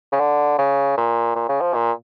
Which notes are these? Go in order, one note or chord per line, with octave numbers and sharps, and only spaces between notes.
C#3
D3
C#3
A#2
A#2
C#3
F3
A#2